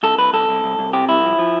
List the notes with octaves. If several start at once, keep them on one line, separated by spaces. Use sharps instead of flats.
C2 A4
C2 B4
C2 A4
C2
C2
C2
C3 G4
C2 E4
F3
F3